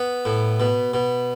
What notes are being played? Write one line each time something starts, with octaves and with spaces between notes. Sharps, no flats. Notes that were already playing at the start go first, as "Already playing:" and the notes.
Already playing: B3
A2
B2
B2